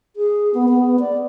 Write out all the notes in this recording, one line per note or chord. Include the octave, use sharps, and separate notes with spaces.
G#4
B3
B3
D5